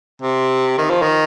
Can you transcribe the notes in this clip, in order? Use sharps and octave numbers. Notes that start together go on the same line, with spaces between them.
C3
D#3
F3
D#3